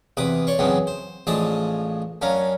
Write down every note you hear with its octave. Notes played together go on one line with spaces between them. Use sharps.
E2 C3 B4 D6 D#6
C#5 D5 C6 C#6
F#2 C#3 E3 B3 C4 D4
C5
A1 F3 G#3 D4 A5 D#6
F#2 C#4 D4 F5 A#5